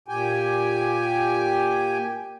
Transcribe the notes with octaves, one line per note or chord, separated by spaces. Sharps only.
A#2 G4 G5 G#5